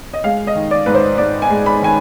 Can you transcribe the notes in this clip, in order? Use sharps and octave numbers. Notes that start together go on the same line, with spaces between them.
D#5
G#3 F5
D#5
D#3
D5
G#2 B4
C5
G#2 D5
G#5
G#3
B5
D#3 G#5